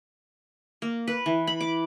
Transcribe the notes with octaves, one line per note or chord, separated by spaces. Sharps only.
A#3
B4
E3
B5
D6